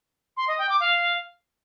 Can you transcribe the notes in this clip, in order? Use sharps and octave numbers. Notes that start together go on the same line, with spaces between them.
C6
D#5
G5
D6
F5